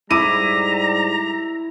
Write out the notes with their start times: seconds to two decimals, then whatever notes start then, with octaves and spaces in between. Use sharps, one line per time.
0.11 G#2 G3 E4 A#5 D6 D#7